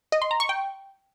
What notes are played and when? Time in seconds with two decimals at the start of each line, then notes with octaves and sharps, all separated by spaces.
0.12 D#5
0.22 C6
0.31 A#5
0.40 C#6
0.49 G5